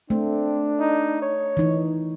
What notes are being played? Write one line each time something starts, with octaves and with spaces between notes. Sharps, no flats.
A3 C4 D4
D#4
C#5
E3 D#4